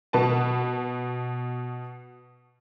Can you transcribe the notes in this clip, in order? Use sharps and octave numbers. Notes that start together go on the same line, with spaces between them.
B2 B4 A5